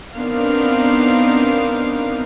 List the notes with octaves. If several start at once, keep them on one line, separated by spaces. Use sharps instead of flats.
B3 C4 D4 D#4 A#4 F5